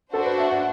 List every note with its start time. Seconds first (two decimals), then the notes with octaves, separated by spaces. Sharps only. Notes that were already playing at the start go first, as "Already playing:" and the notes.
0.14 D4 F#4 A4 C5
0.25 B4
0.38 E5
0.50 F#5